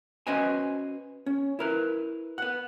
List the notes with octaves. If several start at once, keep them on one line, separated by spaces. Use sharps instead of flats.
C#4 F#4 B4 C5 D#5 G#5
C#4
E4 A#4 B4
B4 F#5